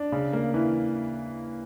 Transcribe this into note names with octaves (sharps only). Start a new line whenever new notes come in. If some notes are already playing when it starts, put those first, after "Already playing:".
Already playing: D4
C#3
A#3
E3